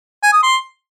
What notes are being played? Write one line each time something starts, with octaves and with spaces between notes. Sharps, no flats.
G#5
D#6
C6